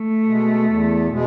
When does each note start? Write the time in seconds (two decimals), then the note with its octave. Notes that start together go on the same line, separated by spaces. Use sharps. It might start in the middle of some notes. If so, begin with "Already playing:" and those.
Already playing: A3
0.24 B2 G#3
0.66 E2
1.08 B2 G#3